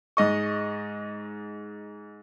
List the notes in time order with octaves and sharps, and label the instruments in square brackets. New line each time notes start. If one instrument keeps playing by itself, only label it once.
[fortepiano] G#2 D#5 C#6